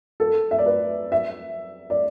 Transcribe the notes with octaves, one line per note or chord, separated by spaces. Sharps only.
A4
E5
D5
B4
E5
D5